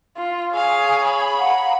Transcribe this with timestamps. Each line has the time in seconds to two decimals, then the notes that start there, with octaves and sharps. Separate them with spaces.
0.17 F4
0.54 G#4 C#5 F5 G#5
1.05 B5
1.39 F5 F#5 A#5